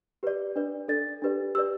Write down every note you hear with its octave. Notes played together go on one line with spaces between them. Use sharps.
G4 B4 D5
D4 B4 D5
D4 A4 D5 A6
D4 G4 B4 D5
G4 B4 D5 E6